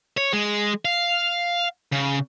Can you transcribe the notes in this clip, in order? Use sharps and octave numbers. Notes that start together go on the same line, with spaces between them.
C#5
G#3
F5
C#3